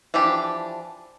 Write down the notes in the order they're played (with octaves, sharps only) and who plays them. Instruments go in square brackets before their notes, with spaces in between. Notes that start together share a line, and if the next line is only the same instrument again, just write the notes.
[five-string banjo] E3 F3 D4 G4